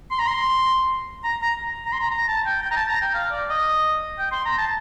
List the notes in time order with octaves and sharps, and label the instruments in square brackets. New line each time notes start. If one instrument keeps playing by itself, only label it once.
[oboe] C6
A#5
C6
A#5
A#5
A#5
C6
A#5
A#5
A5
G5
G5
A#5
A5
A#5
G5
F5
D5
D#5
G5
C6
A#5
A5